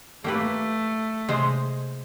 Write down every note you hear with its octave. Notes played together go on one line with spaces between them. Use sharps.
A3 A#3 G4 B4
C3 G#3 C5 D#5